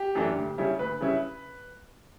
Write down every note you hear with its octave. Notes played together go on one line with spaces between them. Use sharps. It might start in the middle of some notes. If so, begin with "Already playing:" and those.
Already playing: G4
F#2 E3 A3 D4
D2
C#3 G3 C#4 E4
D2 B4
C#3 G3 C#4 E4